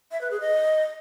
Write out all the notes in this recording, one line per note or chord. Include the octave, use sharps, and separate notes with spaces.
E5
B4
G#4
D#5